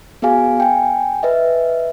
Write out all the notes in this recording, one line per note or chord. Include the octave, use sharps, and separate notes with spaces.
B3 F#4 G#4 F5 G#5
G5 G#5
B4 D#5 E5